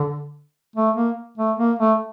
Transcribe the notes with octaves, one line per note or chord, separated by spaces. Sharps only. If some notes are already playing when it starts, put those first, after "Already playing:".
Already playing: D3
A3
A#3
A3
A#3
A3